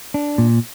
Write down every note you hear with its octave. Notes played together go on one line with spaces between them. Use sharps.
D4
A#2